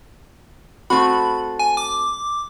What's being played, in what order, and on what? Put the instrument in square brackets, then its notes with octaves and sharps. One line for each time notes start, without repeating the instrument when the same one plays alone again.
[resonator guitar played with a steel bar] A3 C4 F#4 [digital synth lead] B5
[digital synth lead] G#5
D6